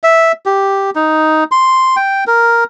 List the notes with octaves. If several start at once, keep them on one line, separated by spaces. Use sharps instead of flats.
E5
G4
D#4
C6
G5
A#4